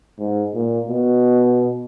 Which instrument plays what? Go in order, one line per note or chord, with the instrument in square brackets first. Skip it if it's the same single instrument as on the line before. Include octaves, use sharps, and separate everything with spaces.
[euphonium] G#2
A#2
B2